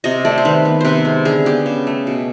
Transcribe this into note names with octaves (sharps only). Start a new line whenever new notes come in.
C3 D#5
A3 D5
C5
D#3 B4
B3
C3 B4 C5
G#3
D3 G#4
B3 G4
C#3
A3
B2